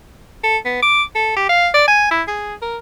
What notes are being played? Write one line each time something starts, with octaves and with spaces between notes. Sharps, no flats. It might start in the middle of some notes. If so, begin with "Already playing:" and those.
A4
B3
D6
A4
G4
F5
D5
G#5
E4
G#4
A#4